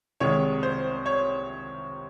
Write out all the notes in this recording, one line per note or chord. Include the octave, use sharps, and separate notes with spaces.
C2 C3 D#3 G#3 C#5
C5
C#5